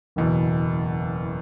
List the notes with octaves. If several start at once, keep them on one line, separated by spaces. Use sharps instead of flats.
F#1 E2 B2